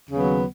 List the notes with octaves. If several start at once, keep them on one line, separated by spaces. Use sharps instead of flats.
D#2 C#3 F#3 B3